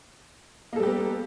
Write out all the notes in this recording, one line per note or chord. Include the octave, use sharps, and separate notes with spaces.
G3 A#3 B3 G4 A4